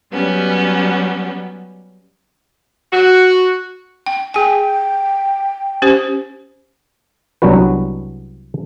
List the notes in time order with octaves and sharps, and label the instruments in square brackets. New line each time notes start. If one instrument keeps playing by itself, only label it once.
[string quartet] F#3 G3 B3 C#4
[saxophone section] F#4
[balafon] G5
[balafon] G#4 G#5 [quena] G5
[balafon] C#4 G4 C5
[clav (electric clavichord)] C2 F#3 B3 D4 F#4 B4